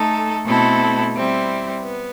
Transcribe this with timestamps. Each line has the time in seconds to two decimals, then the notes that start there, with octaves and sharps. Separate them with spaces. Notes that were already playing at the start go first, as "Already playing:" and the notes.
Already playing: A3 D#4 A4
0.45 B2 A3 C4 E4 A4
1.14 G3 C4 E4
1.82 B3